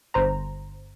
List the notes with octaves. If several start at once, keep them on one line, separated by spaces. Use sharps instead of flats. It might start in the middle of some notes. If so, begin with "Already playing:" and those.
G1 C5 A#5